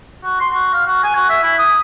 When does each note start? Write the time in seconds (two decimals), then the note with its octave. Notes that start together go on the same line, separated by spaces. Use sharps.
0.24 F#4
0.40 C6
0.53 F#4
0.74 F5
0.87 F#4
1.04 G#5
1.16 F#4
1.30 E5
1.43 E4
1.59 D#6